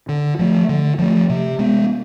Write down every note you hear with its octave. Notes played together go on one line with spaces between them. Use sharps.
D3
F3 A3
D3
F3 A3
C3
G#3 B3